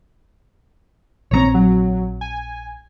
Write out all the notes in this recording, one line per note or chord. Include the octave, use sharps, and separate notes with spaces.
A#1 E3 C4 C#5 A#5
F#3
G#5